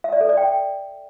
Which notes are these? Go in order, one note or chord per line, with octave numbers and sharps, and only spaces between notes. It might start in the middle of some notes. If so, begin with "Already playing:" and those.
E5
D5
A4
D5
G5